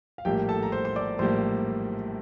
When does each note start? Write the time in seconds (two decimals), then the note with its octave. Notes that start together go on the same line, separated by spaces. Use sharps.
0.18 F5
0.25 A#1 A2 G3 A#3 G4 G5
0.48 A4 A5
0.63 A#5
0.72 C5 C6
0.85 C6
0.96 D5 D6
1.19 A#1 A2 G3 A#3 C5 C6